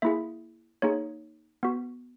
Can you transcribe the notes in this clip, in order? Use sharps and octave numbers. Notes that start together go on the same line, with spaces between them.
A#3 E4 G#4 E5
A#3 D#4 G#4 C#5
B3 F#4